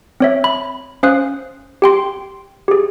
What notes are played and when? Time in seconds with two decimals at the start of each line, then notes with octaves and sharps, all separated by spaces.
0.20 C4 C#5 E5
0.44 B5
1.03 C#4 C5 F5 D#6 F#6
1.82 G4 G5 C6
2.68 G4 G#4